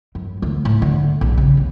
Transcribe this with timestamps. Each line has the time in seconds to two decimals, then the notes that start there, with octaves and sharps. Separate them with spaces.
0.15 F#2
0.42 D2
0.65 A2
0.82 D3
1.21 A#1
1.38 C#3
1.57 C2